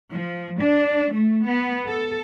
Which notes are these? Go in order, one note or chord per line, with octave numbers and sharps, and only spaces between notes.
F3
D4
A3
B3
A4